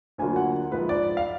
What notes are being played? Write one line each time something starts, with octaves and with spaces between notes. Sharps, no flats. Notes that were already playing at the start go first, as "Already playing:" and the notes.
D2 D3 F#3 A#3 F4 G#5
F#5
A#1 G#2 F3 B4
D5
F5